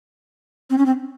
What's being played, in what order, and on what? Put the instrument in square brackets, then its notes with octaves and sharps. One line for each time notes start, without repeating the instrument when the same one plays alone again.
[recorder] C4
C#4
C4